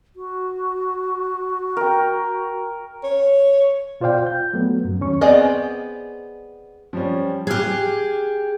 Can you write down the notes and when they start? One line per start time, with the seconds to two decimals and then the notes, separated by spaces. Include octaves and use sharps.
0.16 F#4
1.77 A#4 G5
3.04 C#5
4.00 B2 F4 C5 D5 F5 G5
4.27 G6
4.53 F#3 A3 B3
4.85 F#2 F#3
5.01 D#2 C#4 C#6
5.21 B3 C4 G#4 D5 D#5
6.93 F3 G3 C#4
7.47 G4 G#4 F6 F#6 G#6